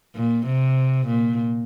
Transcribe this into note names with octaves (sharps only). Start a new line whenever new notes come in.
A#2
C3
A#2